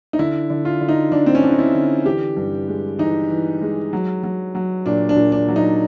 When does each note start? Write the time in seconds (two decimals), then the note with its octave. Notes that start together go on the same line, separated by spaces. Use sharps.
0.13 D#4
0.19 D3 E4
0.50 D3
0.65 F4
0.81 D3
0.89 D#4
1.12 D3 D4
1.26 C4
1.35 C#4
1.43 D3 D4
1.51 D#4
1.59 E4
1.74 D3
2.05 E3 G4
2.37 G2
2.68 G#3
2.99 E3 D#4
3.30 E3
3.61 G#3
3.93 F#3
4.23 F#3
4.55 F#3
4.86 A#2 D4
5.09 D4
5.16 A#2
5.32 D4
5.48 F#3
5.56 D#4